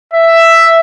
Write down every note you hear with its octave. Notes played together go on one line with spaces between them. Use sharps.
E5